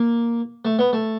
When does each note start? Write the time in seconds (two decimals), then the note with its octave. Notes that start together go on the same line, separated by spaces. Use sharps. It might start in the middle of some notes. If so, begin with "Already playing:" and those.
Already playing: A#3
0.65 A3
0.79 B3
0.93 A3